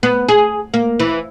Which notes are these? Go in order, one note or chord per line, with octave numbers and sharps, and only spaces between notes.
B3
G#4
A#3
E3